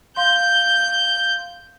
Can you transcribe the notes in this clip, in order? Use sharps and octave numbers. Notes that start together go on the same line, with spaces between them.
F5 C6 G6